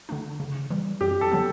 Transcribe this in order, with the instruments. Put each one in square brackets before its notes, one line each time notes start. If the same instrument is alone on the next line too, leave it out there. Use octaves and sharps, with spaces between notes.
[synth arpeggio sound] D3 A3 D4
C#3
E3 G3
[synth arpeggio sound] F#2 [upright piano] G4
[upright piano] A4
[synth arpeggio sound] D3 F#3 B3